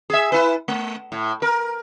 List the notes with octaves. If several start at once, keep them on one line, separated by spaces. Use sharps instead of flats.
G#4 E5
E4 B4
A3
A2
A#4